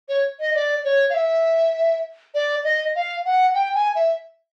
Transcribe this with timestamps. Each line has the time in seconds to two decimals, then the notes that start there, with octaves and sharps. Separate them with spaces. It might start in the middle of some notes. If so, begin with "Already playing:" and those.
0.09 C#5
0.40 D#5
0.55 D5
0.85 C#5
1.10 F5
1.14 E5
2.35 D5
2.64 D#5
2.95 F5
3.25 F#5
3.55 G5
3.75 G#5
3.95 E5